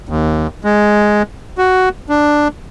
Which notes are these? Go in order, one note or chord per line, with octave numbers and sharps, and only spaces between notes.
D#2
G#3
F#4
D4